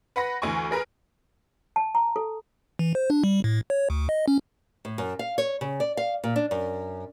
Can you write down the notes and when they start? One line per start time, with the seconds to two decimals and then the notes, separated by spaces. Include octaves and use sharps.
0.16 B4 F#5 B5 A#6
0.42 D2 E3 G#5 C#6
0.71 G#4 A#4 B4
1.76 A5
1.95 A#5
2.16 A4
2.79 E3
2.95 C5
3.10 D4
3.24 G3
3.44 A2
3.70 C#5
3.90 D2
4.09 D#5
4.28 C#4
4.85 A2
4.98 F#2
5.19 F5
5.38 C#5
5.61 C#3
5.80 D5
5.97 F5
6.24 A#2
6.36 D4
6.51 F#2